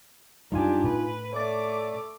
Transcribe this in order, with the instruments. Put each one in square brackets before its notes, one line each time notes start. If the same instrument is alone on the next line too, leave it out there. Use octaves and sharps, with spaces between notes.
[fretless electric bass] F#2 G3 [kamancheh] D4 G4 [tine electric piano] D#4 F4 G#5
[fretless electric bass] A2 [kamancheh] B4
[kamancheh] A3 D6 [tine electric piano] C#5 D5